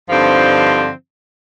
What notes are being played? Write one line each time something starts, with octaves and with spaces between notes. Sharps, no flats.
G2 D3 F3 C4 D#4